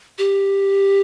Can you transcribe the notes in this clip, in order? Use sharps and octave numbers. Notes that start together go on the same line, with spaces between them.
G4